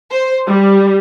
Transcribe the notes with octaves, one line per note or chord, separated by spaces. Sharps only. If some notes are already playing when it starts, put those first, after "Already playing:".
C5
G3